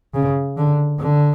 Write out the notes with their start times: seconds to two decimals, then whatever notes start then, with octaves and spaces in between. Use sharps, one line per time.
0.14 C#3
0.57 D3
0.99 D3